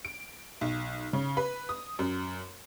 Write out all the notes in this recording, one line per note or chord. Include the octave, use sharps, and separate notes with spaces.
D7
B1
C#3
B4
D#6
F#2